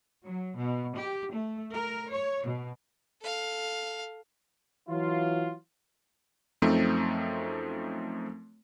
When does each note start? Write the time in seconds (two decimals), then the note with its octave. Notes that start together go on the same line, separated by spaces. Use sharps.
0.24 F#3
0.58 B2
0.95 G4
1.32 A3
1.73 A#4
2.10 C#5
2.45 B2
3.22 A4 F5
4.88 E3 F#3 F4
6.62 F#2 F3 A3 C4 D#4